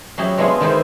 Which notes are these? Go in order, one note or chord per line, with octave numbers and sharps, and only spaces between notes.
F#3 C#4 E4 G4 G#4
G#3 B3 D4 E4 F4 G#4
D#3 G#3 B3 E4 G#4 C5